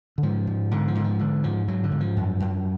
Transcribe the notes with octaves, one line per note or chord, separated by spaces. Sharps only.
D3
G#2 F3
G#2
G#2 D3
F3
G#2 D3
F3
G#2 D3
G#2 F3
G#2 F#3
D3
G#2
F3
F#2
F#2